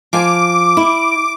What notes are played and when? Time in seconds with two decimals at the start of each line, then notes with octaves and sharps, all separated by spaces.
0.13 F3 F5 G#5 D6
0.77 E4